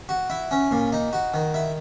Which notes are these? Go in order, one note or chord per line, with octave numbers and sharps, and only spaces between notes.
F#4
E4
C#4
A#2
D#4
F#4
D#3
E4